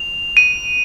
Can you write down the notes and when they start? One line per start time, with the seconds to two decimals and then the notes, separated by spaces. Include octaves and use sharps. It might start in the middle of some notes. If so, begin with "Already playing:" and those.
Already playing: F7
0.37 D#7